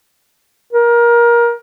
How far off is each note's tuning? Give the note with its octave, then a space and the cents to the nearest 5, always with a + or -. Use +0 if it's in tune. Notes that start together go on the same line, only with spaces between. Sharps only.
A#4 +20